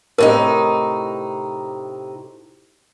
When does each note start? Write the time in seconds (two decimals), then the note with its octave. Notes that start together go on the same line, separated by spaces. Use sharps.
0.18 A2 C3 D#4 A#4